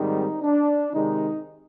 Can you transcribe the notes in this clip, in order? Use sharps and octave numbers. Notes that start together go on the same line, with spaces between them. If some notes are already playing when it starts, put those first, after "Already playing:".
Already playing: G#2 D#3 G3 C4 D#4
D4
C3 D#3 G#3 D#4